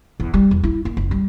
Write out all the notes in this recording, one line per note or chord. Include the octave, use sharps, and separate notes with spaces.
E2
G3
E2
E4
A#3
F#1
G3